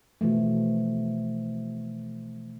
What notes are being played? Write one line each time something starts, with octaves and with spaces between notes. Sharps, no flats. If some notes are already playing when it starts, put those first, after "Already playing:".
B2 E3 F3 A3